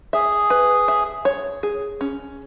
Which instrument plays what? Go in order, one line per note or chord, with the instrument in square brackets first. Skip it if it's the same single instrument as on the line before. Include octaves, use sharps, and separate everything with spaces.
[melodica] G#4 [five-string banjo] E5
[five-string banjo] B4
E5
C#5
G#4
C#4